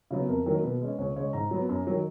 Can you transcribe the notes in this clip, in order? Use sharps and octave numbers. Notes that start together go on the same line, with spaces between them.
C#3 F#3 B3
F2 A#4
D#3 F#3 A#3
B2 B4
G#3 C#4
C#2 C#5
C#3 G#3 C#5
G#2 A#5
F#3 B3
F#2
D#3 F#3